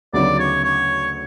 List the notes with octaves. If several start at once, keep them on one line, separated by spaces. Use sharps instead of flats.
D2 C#3 F#3 B3 D#4 D5
C#5
C#5